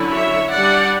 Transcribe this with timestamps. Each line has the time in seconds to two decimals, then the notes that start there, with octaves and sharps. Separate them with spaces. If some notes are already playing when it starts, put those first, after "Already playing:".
Already playing: D3 F#3 C#4 E4
0.12 C#5 E5
0.50 G3 D4 D5 F#5